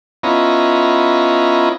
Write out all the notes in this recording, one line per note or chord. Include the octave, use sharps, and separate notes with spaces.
B3 C#4 E4 F4 D#5 A#5